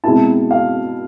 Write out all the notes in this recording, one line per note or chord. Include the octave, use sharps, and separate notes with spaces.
B2 G#3 C4 E4 A5
F5